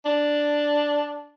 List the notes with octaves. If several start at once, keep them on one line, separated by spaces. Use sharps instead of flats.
D4